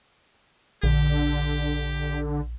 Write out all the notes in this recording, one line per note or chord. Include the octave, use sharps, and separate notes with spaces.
A#1 D3 G4